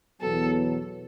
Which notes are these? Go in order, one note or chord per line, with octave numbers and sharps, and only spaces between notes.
E2 B2 F#3 B3 A4